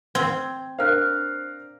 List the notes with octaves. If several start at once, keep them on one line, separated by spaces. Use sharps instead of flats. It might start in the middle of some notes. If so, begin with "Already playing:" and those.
C4 G#6
D4 A#4 C5 F5 F6 F#6